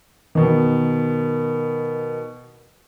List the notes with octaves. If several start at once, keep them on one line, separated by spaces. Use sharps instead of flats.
B2 D#3